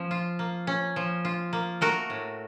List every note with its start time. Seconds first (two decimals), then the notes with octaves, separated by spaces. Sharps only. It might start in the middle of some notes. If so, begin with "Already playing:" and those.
Already playing: F3 C#4
0.11 F4
0.39 A#3
0.67 C#4
0.96 F3
1.25 F4
1.53 A#3
1.81 A3 F#4 A#4
2.10 A2